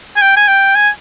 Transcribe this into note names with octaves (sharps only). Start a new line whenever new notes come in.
G#5
G5
G#5
G5
G#5